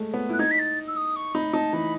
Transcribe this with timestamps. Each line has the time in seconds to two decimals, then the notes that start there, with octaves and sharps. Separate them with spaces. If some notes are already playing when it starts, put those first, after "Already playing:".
Already playing: G#3 A3
0.14 B3
0.30 E4 F#6
0.39 D#4 G#6
0.51 B6
0.59 A6
0.87 E6
0.96 D#6
1.16 C#6
1.35 D#4 B5
1.53 D#4 A5
1.73 E3 B5